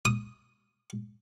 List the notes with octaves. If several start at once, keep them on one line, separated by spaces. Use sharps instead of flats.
D#6